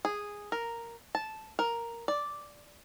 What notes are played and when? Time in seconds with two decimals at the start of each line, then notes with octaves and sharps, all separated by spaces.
0.05 G#4
0.52 A#4
1.15 A5
1.59 A#4
2.08 D5